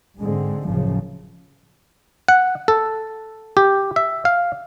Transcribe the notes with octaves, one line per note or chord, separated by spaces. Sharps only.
G#2 D3 G#3 C4
F#1 F#2 A2 C#3 F3
F#5
A4
G4
E5
F5